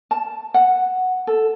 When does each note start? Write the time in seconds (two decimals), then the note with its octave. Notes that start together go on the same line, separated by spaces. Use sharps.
0.11 A5
0.54 F#5
1.27 A4